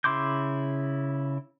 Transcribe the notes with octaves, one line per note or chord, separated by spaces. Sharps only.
C#3 E4 C6 D6 G6